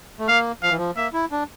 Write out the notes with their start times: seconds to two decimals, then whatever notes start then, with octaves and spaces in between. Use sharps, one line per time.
0.19 A3
0.28 A#3 F5
0.62 F3 F5
0.70 E3
0.77 F3
0.96 A#3 E5
1.13 E4
1.32 D4